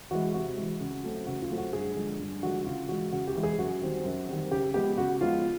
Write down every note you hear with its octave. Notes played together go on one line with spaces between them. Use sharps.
E3 G#3 F#4
C3 F#4
E3 G#3
C#3
F#3 A3 C4
C#3 F#4
F4
F#3 A3 C4
F#4
G2 G#4
D3 F3 G#3
G2
D3 F3 G#3 F#4
C#3 F4
E3 G#3 F#4
C#3 F#4
G4
E3 G#3
G#4
F#2 F#4
D#3 G3 C4
F#2
D#3 G3 C4
C#3 G4
F3 G#3 B3 G4
C#3 F#4
F3 G#3 B3 F4